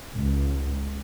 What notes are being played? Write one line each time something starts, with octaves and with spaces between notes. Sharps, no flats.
C#2